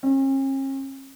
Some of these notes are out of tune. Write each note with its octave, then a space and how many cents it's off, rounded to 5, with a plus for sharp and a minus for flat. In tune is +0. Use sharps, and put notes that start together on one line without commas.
C#4 -45